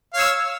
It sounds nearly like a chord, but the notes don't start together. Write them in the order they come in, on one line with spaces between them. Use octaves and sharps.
F5 C#5 E6